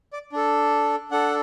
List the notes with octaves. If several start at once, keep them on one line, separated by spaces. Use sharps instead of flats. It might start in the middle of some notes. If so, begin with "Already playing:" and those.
D5
D4 A4
D4 A4 F#5